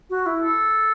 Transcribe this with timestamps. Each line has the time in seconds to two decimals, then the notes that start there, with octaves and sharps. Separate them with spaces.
0.10 F#4
0.26 E4
0.41 A4